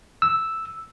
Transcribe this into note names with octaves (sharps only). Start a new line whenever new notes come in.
E6